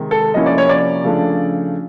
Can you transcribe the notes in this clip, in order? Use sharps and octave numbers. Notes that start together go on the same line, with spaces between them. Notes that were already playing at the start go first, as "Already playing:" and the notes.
Already playing: C3 D#3 G#3
A4
C3 F3 A#3 C#4 E4 D#5
D5
C#5
D5
C#3 F3 A3 D4